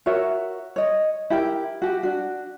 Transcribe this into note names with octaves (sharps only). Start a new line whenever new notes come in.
F#4 A#4 C#5 E5
C#5 D#5
E4 G4 A#4 G5
F#4 G4
D4 F#4